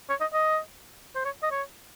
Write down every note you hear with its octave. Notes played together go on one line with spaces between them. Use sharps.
C#5
D#5
D#5
C5
C#5
D#5
C#5